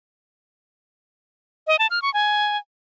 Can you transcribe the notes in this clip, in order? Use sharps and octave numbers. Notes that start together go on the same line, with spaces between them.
D#5
A5
F6
C#6
G#5